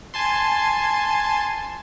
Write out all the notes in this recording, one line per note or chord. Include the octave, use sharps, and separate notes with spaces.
G#5 A5 C6